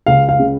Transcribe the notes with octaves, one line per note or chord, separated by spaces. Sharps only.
C#2 F5
F5
C#3